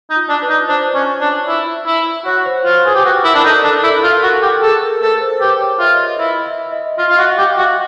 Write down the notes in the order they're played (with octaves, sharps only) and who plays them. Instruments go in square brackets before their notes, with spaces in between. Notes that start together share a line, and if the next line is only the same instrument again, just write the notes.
[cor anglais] D#4
[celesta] F4
[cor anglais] D4
[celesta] B4
[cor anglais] D#4
[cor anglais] D4 [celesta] C5
[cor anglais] C#4 [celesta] C#5
[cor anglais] D4
E4
E4
[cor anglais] F#4 [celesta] C#5
[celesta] C5
[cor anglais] F4 [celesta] C5
[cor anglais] G#4 [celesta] B4
[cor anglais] G4
[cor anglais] F#4 [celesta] B4
[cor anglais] E4 [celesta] A#4
[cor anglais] D4
[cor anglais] D#4 [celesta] A4
[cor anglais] D4 [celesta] A4
[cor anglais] E4 [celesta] A4
[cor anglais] F4
[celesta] A#4
[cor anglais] F#4
[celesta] A4
[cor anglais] G4
[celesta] G#4 [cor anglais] A4
[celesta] A#4
[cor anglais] A4 [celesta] B4
[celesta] C5
[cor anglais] G4 [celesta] B4
[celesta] C#5
[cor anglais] F4 [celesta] E5
[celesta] D#5
E5
[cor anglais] E4 [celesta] E5
[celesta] E5
D#5
[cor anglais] F4 [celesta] F5
[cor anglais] F4
F#4
[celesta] F5
[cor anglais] G4
[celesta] F5
[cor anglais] F#4